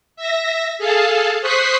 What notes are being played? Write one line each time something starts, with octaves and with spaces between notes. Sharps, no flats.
E5 A#6
G#4 A4 F5 A5
C5 C#6 D#6 F#6 B6 C7